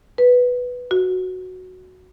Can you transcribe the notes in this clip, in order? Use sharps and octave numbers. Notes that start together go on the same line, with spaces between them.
B4
F#4